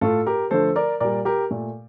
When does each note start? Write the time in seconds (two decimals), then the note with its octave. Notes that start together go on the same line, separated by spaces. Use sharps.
0.01 A2 A3 F4 A4
0.26 G4 A#4
0.51 D3 F3 A3 A4 C5
0.76 A#4 D5
1.00 A#2 G3 A#4 D5
1.25 G4 A#4
1.51 A#2 A3